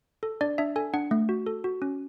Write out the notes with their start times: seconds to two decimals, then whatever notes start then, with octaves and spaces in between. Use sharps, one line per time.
0.23 A4
0.41 D4 D5
0.58 D4 E5
0.76 A4 G#5
0.94 D4 F#5
1.11 A3
1.29 F#4
1.46 A4
1.64 F#4
1.82 C#4